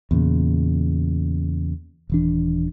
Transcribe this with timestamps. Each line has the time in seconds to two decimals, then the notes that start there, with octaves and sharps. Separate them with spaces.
0.11 E2 A#2 C#3
2.10 D#1 E3 D4